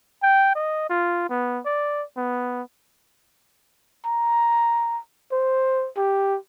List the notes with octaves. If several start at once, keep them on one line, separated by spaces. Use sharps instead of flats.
G5
D#5
F4
B3
D5
B3
A#5
C5
G4